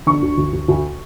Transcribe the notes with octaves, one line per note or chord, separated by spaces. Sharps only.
D3 C#6
D2
D2
D2
D2